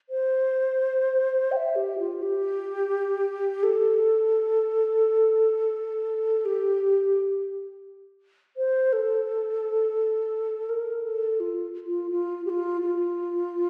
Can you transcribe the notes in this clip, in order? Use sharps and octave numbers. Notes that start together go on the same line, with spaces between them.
C5
G5
E5
G4
F4
G4
A4
G4
C5
A4
A#4
A4
F4
F4
F4
G4
F4
F4